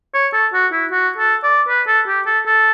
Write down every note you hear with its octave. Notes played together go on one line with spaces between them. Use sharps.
C#5
A4
F#4
E4
F#4
A4
D5
B4
A4
G4
A4
A4